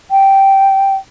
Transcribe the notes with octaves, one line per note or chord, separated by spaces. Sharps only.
G5